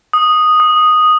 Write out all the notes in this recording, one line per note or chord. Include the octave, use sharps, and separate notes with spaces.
D#6
D#6